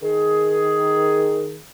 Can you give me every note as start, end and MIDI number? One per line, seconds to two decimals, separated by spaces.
0.02 1.59 51
0.02 1.59 68